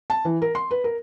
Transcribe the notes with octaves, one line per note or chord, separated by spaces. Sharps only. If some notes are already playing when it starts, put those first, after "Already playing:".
A5
E3
A#4
C6
B4
A#4